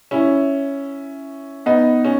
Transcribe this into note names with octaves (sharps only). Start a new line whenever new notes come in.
C#4 E4
B3 D#4
C#4